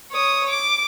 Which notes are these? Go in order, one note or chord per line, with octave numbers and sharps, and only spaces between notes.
C#5 D#6
D6